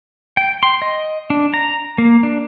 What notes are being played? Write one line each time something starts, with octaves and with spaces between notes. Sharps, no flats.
G5
C6
D#5
D4
A#5
A#3
D4